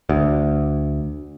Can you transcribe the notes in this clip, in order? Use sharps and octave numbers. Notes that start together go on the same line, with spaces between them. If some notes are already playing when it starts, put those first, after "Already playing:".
D2